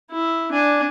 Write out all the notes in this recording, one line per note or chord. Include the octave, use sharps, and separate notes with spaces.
E4
D4 G#5